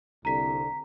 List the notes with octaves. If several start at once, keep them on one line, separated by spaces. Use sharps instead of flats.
C2 D3 A#5 B6